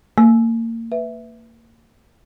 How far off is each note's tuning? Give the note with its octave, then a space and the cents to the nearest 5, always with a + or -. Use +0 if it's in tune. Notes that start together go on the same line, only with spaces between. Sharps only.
A#3 -35 E6 +0
B4 +0 E5 +5